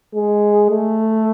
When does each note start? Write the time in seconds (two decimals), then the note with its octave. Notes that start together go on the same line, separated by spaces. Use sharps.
0.16 G#3
0.70 A3